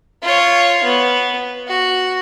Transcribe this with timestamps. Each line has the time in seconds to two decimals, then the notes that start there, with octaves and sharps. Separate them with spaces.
0.22 F4 C#5
0.84 B3
1.68 F#4